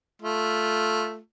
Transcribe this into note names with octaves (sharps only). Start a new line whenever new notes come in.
A3 F4